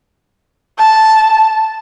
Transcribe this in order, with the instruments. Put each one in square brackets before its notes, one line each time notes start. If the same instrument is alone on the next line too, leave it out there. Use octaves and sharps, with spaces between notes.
[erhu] A5